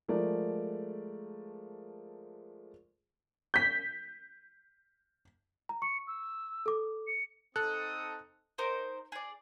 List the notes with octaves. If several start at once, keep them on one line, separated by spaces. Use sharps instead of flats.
F3 G#3 A3 A#4 D5
G6 B6
A#5
C#6 C#7
E6
A4 D6
C#7
C4 D#4 A4 D#6 F#6
D#4 A#4 C5
G#4 D5